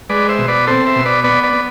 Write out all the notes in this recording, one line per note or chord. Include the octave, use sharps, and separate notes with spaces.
G#3 B4 D5
C5 E5
B2
B4 D5
C4 A4 C5
C5 E5
B2
B4 D5
B3 B4 D5
B4 D5
B3